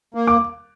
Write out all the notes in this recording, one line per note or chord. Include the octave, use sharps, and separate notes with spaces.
A#3
D6